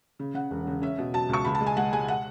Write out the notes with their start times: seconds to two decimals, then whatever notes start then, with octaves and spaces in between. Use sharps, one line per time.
0.19 C#3
0.34 C#3 F#5
0.51 E1
0.67 C#3
0.82 C#4 E5
0.98 B2
1.13 F#3 A5
1.29 C#2 C#6
1.44 C#2 B5
1.55 A5
1.61 G#3
1.66 G#5
1.77 G#3 F#5
1.93 G#3 G#5
2.08 F#5